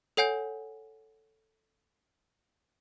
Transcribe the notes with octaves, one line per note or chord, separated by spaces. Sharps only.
A4 C#5 F#5 G#5 G6